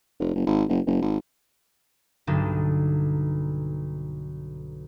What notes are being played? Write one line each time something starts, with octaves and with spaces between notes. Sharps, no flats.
F1
F#1
G#1
F#1
F#1
G#1
B1 G2 D3 D4 D#4 A5